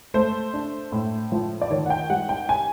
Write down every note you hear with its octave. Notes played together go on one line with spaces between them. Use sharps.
A3 C5
D4
A2
F3
D5
D#3 C#5
F#5
G5
G3 F#5
G5
G#5